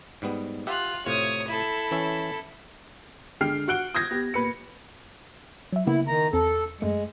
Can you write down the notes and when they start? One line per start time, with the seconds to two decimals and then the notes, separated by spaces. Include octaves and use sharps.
0.22 G#2 G3 B3
0.67 F4 G4 E5 F#5 F#6
1.06 A2 C3 F4 C#5 D#6
1.48 E4 A4
1.91 E3 C#4 E5
3.41 D3 G#3 G5 F6 C7
3.68 F#4 F#5 F#6 D7 G7
3.95 D#6 G6 G#6 A#6
4.11 B3 G4
4.34 A#2 B4 C#7
5.72 F#3 E5
5.87 C#3 A#3 B3 E4
6.07 D#3 A#5
6.33 E2 C4 A4
6.81 F#2 G#3 A3 C#7